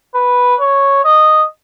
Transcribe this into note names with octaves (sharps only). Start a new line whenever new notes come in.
B4
C#5
D#5